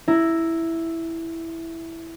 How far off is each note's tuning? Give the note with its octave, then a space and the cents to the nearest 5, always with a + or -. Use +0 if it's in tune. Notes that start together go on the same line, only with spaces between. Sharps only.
E4 +0 A#5 +0